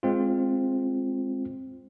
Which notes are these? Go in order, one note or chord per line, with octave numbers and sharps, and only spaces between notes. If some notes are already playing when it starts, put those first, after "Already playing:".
G#3 C4 F4